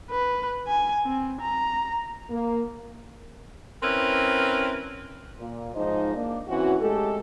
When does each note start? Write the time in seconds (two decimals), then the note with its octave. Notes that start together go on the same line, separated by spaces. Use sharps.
0.11 B4
0.67 G#5
1.05 C4
1.41 A#5
2.29 A#3
3.82 C4 C#4 E4 A#4 B4
5.39 A#2
5.75 G#2 F3 D#4 C5 D#5
6.16 A#3 D4
6.48 E3 C4 C#4 F#4
6.81 G#3 A3 G4 A4